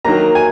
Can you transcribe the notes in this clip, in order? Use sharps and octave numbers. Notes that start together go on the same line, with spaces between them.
D#3 F#3 A#3 A#5
G#5